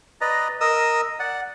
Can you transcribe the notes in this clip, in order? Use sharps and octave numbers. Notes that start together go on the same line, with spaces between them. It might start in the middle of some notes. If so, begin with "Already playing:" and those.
B4 D5 D#5 A#5
A#4 D#5 D#6 E6
D5 F#5